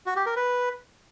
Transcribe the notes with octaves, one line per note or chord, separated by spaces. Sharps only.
F#4
G4
A#4
B4